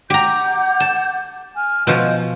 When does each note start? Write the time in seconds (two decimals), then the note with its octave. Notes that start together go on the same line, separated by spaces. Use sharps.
0.10 G4 F#5 A#5 D6 G6
0.80 A5
1.55 G#5 F6
1.87 B2 F3 D#5 G6